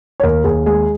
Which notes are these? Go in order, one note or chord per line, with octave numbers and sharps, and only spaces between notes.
C#5
D#2 A#4
D#2 G#4
G#3 G#4